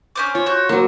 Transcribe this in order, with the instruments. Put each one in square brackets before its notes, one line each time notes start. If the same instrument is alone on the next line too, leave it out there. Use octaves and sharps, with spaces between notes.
[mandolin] C#4 C5 D6
[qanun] F4 [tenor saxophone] C#5
[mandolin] F#4 G6
[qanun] F#3 A#3